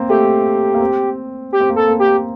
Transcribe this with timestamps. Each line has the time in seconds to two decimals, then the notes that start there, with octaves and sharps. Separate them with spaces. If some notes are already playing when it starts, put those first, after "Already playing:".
Already playing: A#3 C4
0.09 A3 G4
0.74 A#3
0.80 C4
1.53 G4
1.60 C4
1.70 A#3
1.76 A4
1.88 A#3
2.00 G4
2.07 A#3